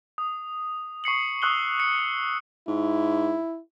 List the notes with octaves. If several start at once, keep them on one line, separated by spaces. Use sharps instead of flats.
D#6
C#6 C7 C#7 F#7
C#6 D#6 E6 F#6 F#7 G7
C#7
G#2 E4